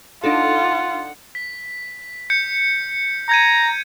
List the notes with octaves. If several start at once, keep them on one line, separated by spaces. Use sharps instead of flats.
D4 D#4 F4 A4 F#5
B6
G6 C#7
A#5 G6 G#6 D#7